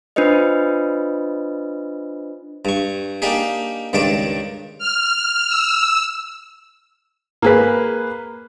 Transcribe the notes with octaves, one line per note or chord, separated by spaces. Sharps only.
D4 F4 B4 C5 D#5
G2 C#6
A#3 D4 D#4 G4 G#4
C#2 G2 D#3 D5 A5
F6
E6
A#3 G#4 B4